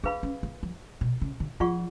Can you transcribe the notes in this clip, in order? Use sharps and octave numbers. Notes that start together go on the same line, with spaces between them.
D4 G#4 B4 F5 B5
C#4
B3
F3
B2
C#3
D3
F3 F4 G#4 D5 F#5 C#6